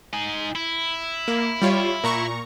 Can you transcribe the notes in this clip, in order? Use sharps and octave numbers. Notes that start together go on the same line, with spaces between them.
D#4 G#5
E4
A#3
G3 F4 C#5
A#2 A#5 C#6